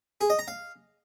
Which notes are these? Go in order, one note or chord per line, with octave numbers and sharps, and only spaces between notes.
G#4
D#5
A#5
F5